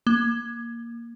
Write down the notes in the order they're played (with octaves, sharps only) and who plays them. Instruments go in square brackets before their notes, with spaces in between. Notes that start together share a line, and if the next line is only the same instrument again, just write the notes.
[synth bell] A#3